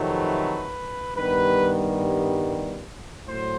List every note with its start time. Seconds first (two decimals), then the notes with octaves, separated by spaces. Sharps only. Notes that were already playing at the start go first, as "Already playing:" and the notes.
Already playing: F2 C3 D#3 F#3 A3
0.09 B4
1.15 G2 D#3 G3 B3 B4
3.28 A2 F#3 C5